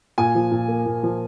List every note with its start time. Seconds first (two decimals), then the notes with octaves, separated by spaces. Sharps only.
0.18 A#2 G#5
0.35 F3
0.51 A#2
0.68 A#3
0.86 A#2
1.03 F3